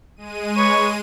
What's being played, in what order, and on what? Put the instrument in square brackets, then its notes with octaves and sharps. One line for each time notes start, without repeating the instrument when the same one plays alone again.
[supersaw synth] G#3 D#7
[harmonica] B4 C#5